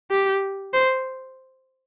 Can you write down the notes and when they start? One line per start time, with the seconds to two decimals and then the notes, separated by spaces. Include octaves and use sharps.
0.11 G4
0.74 C5